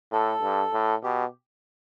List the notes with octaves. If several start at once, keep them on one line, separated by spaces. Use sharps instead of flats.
A2 A4
G2
A2
B2 G4